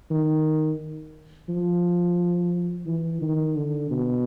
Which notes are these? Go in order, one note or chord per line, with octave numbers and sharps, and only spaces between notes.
D#3
F3
E3
D#3
D3
B2